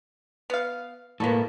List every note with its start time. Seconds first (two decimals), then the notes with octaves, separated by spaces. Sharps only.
0.50 B3 F5
1.20 A2 A#3 B3 A4